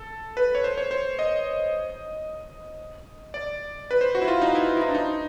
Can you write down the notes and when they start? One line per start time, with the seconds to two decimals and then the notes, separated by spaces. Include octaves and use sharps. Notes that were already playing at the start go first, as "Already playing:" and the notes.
Already playing: A4
0.37 B4
0.55 C#5
0.64 C5
0.78 C#5
0.91 C5
1.19 D#5
3.34 D5
3.91 B4
4.01 C5
4.15 F#4
4.22 E4
4.28 F4
4.42 D#4
4.55 E4
4.77 E4
4.82 D#4
4.89 D4
4.95 D#4